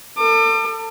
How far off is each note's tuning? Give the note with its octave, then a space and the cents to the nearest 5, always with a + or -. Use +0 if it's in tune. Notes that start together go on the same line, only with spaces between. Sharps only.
A4 +35 D6 +35